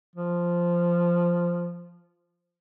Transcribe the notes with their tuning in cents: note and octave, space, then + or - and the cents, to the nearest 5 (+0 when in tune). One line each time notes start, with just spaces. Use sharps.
F3 -5